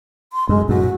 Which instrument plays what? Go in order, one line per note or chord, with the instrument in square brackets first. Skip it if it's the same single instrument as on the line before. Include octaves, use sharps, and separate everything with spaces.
[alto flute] C6
[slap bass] F#2 [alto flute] G#3
[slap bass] F#2 A2 [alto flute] F#4